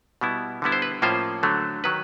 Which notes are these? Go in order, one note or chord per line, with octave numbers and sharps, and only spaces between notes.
B2 G3 B3 E4
D3 G3 B3 E4
C5
B4
A2 F3 A#3 C#4 F4 C5
D3 F#3 A3
D#3 F#3 B4